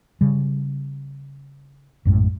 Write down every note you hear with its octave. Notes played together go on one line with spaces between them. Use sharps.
C#3 G3
A#1 F#2 A2 G#3